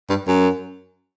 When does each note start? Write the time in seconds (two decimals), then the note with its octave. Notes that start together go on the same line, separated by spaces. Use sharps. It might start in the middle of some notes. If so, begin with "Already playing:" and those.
0.09 G2
0.27 F#2